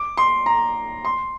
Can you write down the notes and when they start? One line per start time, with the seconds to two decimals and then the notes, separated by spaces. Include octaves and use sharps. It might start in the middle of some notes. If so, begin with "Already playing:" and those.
Already playing: D6
0.17 C6
0.46 A#5
1.05 C6